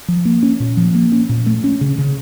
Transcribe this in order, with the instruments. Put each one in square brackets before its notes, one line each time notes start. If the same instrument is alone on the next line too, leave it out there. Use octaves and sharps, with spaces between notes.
[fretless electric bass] F3
A#3
C#4
A#2
F3
A#3
C#4
A#2
A3
C#4
C#3
C#3